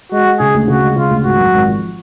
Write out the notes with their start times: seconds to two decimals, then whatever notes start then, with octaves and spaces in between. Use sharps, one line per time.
0.12 G#3 F#4
0.26 G#3
0.39 C#3 G#4
0.54 D2
0.68 C#3 F#4
0.82 G#3
0.96 C#3 F4
1.10 D2
1.24 G#1 F#4
1.38 F#2
1.54 G#1
1.67 F3